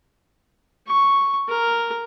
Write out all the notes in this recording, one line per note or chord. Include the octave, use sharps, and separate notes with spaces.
C#6
A#4